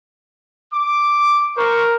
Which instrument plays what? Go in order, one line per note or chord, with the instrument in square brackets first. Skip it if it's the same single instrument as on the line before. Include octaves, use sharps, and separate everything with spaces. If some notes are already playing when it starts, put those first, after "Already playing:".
[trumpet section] D6
[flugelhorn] A#4 [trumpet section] C5 C#6